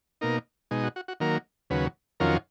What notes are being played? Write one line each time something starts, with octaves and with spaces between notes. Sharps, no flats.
B2 A#3 D#4 A#4
B2 G#3 D#4
F#4
F#4
F#4
D#3 F#3 A#3 A#4
D#2 C#3 F#3 B4
F2 D#3 F#3 C#4 F4 A#4